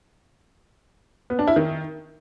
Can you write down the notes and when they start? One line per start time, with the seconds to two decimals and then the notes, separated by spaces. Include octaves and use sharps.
1.30 B3
1.39 D4
1.48 E4
1.56 D#3